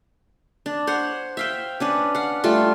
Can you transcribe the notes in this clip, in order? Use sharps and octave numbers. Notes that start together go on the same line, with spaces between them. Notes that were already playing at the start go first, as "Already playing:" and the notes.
D4
C5 C#5 F#5
E5 F5 G5
C#4 D4 B4
F5 F#5
G3 A3 F4